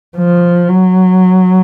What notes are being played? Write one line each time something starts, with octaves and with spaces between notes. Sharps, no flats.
F3
F#3